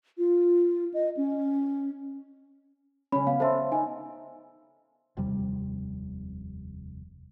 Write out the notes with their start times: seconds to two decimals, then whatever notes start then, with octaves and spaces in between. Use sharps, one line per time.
0.18 F4
0.94 D#5
1.17 C#4
3.12 C#3 C#4 B5
3.27 B3 F5
3.40 A4 C5 E5 C6
3.72 D#4 G#5
5.17 F1 D#2 C3 G3